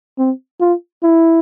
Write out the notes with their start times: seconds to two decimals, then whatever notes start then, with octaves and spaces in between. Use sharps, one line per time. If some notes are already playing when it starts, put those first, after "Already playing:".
0.18 C4
0.61 F4
1.03 E4